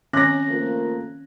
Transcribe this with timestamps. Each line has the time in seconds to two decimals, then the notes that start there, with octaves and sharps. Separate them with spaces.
0.13 D#3 C4 C#4 F#6 A#6
0.48 F3 A3 A#3